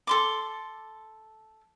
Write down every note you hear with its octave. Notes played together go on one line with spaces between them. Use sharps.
A4 C6 D6